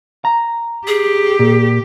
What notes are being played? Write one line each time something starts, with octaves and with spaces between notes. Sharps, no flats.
A#5
G4 G#4
A#2